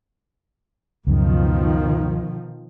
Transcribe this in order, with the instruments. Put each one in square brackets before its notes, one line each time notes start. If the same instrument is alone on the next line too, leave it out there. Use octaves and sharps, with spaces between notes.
[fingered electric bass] C#2 F#2 [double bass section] B2 D#3 F3